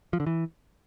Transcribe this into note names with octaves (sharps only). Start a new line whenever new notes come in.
F3
D3
E3